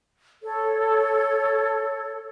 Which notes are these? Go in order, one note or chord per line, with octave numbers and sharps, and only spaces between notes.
A4 C#5